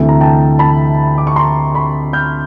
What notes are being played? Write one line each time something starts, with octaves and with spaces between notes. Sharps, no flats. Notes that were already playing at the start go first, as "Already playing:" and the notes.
Already playing: D2 C3 E3 A3
A#5
G5 A5
A5 B5
D6
C#6
A#5 C6
B5 C#6
F6 G6